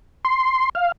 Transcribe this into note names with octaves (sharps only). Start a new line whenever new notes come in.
C6
F5